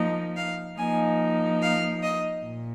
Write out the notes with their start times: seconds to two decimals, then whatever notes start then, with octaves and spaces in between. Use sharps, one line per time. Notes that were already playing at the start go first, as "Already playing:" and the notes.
Already playing: F3 A#3 D#4
0.36 F5
0.77 F3 A#3 D#4 G#5
1.62 F5
2.03 D#5
2.44 A#2